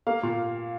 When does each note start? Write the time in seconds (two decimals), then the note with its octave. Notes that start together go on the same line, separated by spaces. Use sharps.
0.07 A#3 F5
0.23 A#2